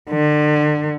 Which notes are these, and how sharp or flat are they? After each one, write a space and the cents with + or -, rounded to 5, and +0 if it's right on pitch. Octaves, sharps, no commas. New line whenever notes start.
D3 +35